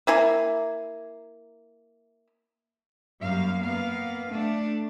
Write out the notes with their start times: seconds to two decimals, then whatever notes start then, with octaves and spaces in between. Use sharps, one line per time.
0.07 A#3 E4 G#5
3.23 F#2 G3 A#3 F5
3.62 A#3 B3 F5
4.31 A3 D4